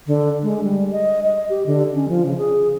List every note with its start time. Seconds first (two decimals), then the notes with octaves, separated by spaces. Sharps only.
0.07 D3
0.43 G#3
0.63 G3
0.92 D#5
1.24 D#5
1.49 G4
1.66 D3
1.93 C#4
2.08 F3
2.25 C#3
2.38 G#4